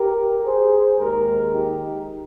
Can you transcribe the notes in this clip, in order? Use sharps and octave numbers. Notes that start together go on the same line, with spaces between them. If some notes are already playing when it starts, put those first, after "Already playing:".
Already playing: G4 A#4
G#4 C5
D#2 D#3 G#3 G4 A#4
D#4 G4